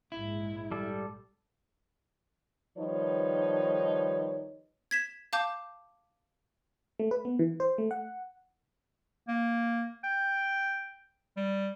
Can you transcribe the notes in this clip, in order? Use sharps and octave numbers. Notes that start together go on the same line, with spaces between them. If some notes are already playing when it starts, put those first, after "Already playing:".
A#1 G#2 G#3 E4
G3 A4
D#3 F3 G3 D#4 B4 C#5
G#6 B6 E7
F5 A5 D6 G6
A3
B4
B3
E3
C5
A3
F#5
A#3
G5
G3